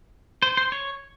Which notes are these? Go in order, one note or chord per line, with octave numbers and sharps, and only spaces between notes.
C5
C5
C#5